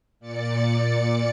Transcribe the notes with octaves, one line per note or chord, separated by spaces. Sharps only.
A#2 D5 A6 C#7